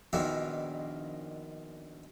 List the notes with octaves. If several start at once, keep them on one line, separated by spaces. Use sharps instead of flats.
A#1 B2 D#3 F3 A#3 E5